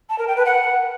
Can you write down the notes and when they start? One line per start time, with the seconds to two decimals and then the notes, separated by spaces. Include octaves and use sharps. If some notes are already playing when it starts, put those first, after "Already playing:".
0.10 A5
0.19 A#4
0.28 G5
0.36 B4
0.45 F#5